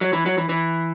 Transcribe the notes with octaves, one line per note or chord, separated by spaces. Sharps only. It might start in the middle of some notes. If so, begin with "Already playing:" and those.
F#3
E3
F#3
E3
E3